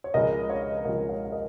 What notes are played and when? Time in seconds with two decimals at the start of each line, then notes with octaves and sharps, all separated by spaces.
0.04 C#5
0.14 C#2 C#3 F3 G#3 A#4 D#5
0.50 C#5 F5
0.85 C#2 C#3 F3 G#3 A#4 D#5
1.09 C#5 F5
1.25 F5
1.32 A#4 D#5